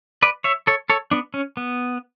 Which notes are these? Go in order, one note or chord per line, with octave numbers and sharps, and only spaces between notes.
B4 D5
C#5 E5
A4 C#5
A4 C#5
B3 D4
C#4
B3